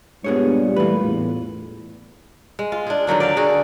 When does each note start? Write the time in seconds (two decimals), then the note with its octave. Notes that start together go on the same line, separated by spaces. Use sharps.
0.24 G2 A#2 G3 G#3 B3 D4 G#4 C#5
0.76 E3 A3 F4 B4
1.05 E2 A2
2.59 G#3
2.72 F4
2.87 D4 G#4
3.07 D3 D#3 F#3 D4
3.20 D5 F5
3.37 D3 F#4 G#4